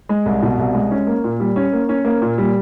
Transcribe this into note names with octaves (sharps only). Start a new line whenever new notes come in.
G#3
C2
B2
C2
G#3
C#4
A#3
A#2
G3
C#4
A#3
C#4
A#3
A#2
G3